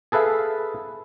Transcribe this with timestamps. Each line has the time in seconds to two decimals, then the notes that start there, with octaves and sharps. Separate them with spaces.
0.12 G#4 A4 B4 E5 F5